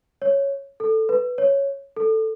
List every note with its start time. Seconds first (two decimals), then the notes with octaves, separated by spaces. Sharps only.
0.22 C#5
0.80 A4
1.09 B4
1.38 C#5
1.96 A4